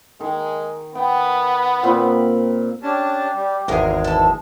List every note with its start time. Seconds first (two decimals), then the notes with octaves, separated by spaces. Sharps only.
0.21 D#3 G#3
0.95 B3 G5
1.83 A#2 C4 B5
2.83 C#4 D4 G4 A5
3.34 G3
3.68 G#1 E2 B2 G#3 G#4 A#4 F5
4.04 E3 A4 A5